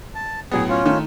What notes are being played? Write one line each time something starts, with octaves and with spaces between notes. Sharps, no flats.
A5
A2 F#3 B3 G#4
C#4 F4
D#3 A3